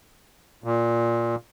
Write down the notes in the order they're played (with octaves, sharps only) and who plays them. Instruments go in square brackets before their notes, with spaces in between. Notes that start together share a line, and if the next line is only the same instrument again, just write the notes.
[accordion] A#2